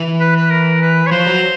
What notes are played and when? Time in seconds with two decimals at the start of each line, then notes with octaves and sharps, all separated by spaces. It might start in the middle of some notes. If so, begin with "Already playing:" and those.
Already playing: E3
0.20 B4
0.36 B4
0.51 A#4
0.82 B4
1.07 C#5
1.11 F3 C5
1.26 F#3